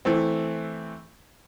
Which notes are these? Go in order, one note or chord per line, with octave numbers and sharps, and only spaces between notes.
E3 A3 C4